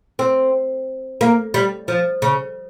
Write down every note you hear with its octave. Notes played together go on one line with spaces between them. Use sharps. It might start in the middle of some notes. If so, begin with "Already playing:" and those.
C4
A#3
G3
F3
C#3